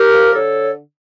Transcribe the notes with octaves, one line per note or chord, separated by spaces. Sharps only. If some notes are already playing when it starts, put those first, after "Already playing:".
Already playing: G4 A#4
F3
D3 A4 C#5